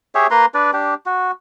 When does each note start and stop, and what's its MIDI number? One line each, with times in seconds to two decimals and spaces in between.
0.15 0.27 67
0.15 0.27 68
0.15 0.27 73
0.15 0.27 76
0.31 0.45 58
0.31 0.45 71
0.31 0.45 82
0.31 0.45 84
0.54 0.71 62
0.54 0.71 71
0.54 0.71 74
0.73 0.94 62
0.73 0.94 67
1.06 1.31 66